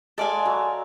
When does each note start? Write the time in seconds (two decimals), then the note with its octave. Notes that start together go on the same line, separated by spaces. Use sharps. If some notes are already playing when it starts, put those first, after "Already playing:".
0.18 G#3 A4 D5 F5 G#5
0.45 F#3